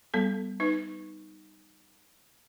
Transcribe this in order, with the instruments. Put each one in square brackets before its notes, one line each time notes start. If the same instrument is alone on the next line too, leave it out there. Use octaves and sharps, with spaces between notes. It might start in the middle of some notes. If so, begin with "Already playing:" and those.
[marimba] G3 B3 A4
[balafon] D#4 B4